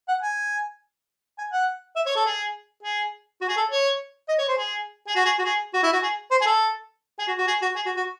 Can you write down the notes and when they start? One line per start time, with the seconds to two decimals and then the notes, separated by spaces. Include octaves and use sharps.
0.09 F#5
0.23 G#5
1.39 G#5
1.52 F#5
1.96 E5
2.06 C#5
2.16 A4
2.26 G#4
2.83 G#4
3.41 F#4
3.48 G#4
3.57 A4
3.71 C#5
4.29 D#5
4.39 C#5
4.48 C5
4.58 G#4
5.07 G#4
5.16 F#4
5.25 G#4
5.39 F#4
5.44 G#4
5.74 F#4
5.83 E4
5.93 F#4
6.03 G#4
6.31 C5
6.41 G#4
6.46 A4
7.19 G#4
7.28 F#4
7.38 F#4
7.47 G#4
7.62 F#4
7.76 G#4
7.86 F#4
7.97 F#4